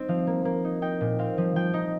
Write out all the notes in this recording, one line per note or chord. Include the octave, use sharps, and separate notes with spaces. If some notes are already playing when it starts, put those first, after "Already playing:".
Already playing: C4 D#4
F3 F5
A#3
A#3
D#4
D#4 G5
A#2
C4 F5
F3
F3 G5
D#4